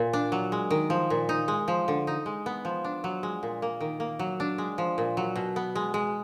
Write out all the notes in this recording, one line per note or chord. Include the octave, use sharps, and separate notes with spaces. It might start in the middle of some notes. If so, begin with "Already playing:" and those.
Already playing: A#2
D4
F#3
G#3
D#3
F3
A#2
D#4
G#3
F3
D3
D#4
G#3
B3
F3
D4
F#3
G#3
A#2
A#3
D#3
A#3
F#3
D4
G#3
F3
A#2
F#3
B2
B3
G#3
G#3